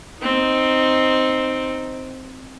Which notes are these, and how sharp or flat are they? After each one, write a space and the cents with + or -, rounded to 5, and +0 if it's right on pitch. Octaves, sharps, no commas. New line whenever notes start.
C4 +0 D#4 +0